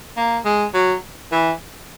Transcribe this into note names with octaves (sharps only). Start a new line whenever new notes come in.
A#3
G#3
F#3
E3